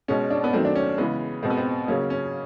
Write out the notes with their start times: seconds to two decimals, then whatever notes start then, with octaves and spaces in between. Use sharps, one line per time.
0.08 B2 G#3 C#4
0.30 D4
0.44 B3
0.53 D#3 F#3 A3 C4
0.65 D4
0.75 C#4
0.98 C#3 E3 G#3 B3
1.43 B2 G#3 C4
1.50 B3
1.57 C4
1.88 C#3 F#3 A#3 C#4
2.10 C#4